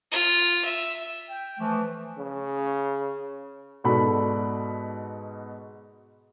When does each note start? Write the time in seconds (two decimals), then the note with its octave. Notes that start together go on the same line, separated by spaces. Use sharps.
0.12 F4
0.65 E5
1.29 G5
1.59 E3 F3 A3
2.18 C#3
3.84 G#2 B2 F#4 A4 D5 B5